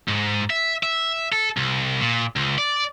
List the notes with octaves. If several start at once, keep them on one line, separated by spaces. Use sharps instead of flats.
G#2
E5
E5
A4
C2
A#2
C#2
D5